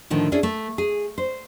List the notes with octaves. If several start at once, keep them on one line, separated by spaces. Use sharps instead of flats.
A2 D3 D#3 F3
C#4 D4 E4 G#4 A4
A3
G#4
C5